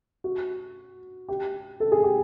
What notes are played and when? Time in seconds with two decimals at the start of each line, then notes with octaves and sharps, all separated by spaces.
0.24 F#4
1.28 G4
1.80 A4
1.92 G#4
2.04 G4